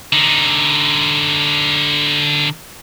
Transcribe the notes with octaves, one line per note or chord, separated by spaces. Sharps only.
D3 D#4